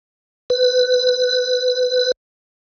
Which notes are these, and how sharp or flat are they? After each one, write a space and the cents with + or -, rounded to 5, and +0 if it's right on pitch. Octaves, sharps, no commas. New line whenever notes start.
B4 +25